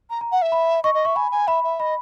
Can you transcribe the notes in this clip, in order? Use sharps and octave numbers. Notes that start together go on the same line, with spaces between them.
A#5
A#5
F#5
E5
B5
D#5 C#6
D#5
E5 C#6
G#5 B5
G#5
E5 B5
E5
D#5 B5